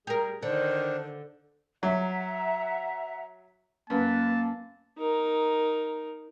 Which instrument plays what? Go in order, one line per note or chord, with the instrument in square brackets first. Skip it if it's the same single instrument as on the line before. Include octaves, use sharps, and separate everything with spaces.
[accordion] G3 [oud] G4 A#4 [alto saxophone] G#4
[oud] D3 [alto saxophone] D#3 [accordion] D4 [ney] C5
[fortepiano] F#3 [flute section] E5 F#5 A#5
[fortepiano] F#2 [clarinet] A#3 [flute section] B4 [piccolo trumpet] A5
[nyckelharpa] D#4 A#4